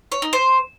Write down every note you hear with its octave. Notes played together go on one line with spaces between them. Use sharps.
C#5
D#4
C5